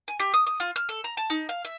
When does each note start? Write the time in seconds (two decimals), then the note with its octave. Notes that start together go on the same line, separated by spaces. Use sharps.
0.08 G#5
0.20 G4
0.34 D#6
0.47 D#6
0.60 F4
0.76 F6
0.89 A4
1.04 A#5
1.17 A5
1.30 D#4
1.49 F5
1.65 E5